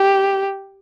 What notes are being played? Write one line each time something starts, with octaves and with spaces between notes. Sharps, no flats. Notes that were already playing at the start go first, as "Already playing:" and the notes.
Already playing: G4